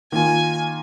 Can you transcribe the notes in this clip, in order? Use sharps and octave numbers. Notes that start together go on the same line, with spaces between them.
D#3 A#3 F4 G#5